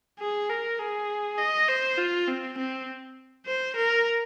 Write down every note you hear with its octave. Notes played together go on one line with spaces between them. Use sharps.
G#4
A#4
G#4
D#5
C5
F4
C4
C4
C5
A#4